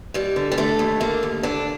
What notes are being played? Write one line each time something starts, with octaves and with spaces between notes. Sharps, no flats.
D#2 G3
D3
G3
D3 A3
D#2
D3 A#3
D#2
D3 D4